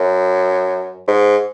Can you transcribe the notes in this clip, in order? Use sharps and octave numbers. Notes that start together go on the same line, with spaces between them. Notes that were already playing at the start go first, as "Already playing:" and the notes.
Already playing: F#2
G#2